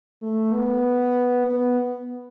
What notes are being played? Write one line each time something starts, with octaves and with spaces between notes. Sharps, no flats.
A3
B3
B3